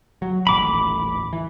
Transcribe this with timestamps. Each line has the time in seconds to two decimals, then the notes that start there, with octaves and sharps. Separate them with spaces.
0.22 F#3
0.47 D#1 A1 B5 D6
1.33 E3